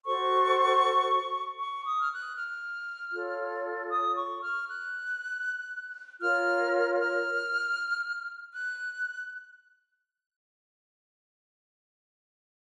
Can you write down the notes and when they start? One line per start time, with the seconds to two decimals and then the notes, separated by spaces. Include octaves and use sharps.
0.05 F#4 A4 C5 C#6
1.59 C#6
1.85 D#6
2.00 F6
2.10 F#6
2.36 F6
3.13 F4 A4 C#5
3.91 D#6
4.16 C#6
4.41 F6
4.67 F#6
6.21 F4 A#4 C#5 F6
6.98 F6
8.52 F#6